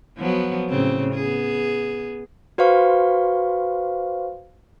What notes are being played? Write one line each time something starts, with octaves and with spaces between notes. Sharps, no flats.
F3 F#3 B3
A2 C#3 C4
B3 G#4
F#4 B4 C5 F5 C#6